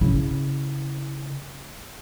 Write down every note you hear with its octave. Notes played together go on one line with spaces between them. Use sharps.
C#3 E4